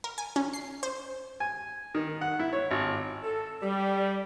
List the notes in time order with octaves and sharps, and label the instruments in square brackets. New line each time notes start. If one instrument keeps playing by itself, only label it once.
[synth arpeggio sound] A#4
G#5
C#4
C7
C5
[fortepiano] G#5
D#3
F#5
E4
C#5
G#1
[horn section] A4
G3